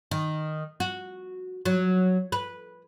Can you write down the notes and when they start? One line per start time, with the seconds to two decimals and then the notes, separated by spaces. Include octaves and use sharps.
0.11 D#3
0.80 F#4
1.65 F#3
2.32 B4